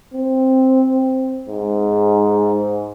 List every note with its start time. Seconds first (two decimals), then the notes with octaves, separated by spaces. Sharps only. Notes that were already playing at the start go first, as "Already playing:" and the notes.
0.14 C4
1.48 G#2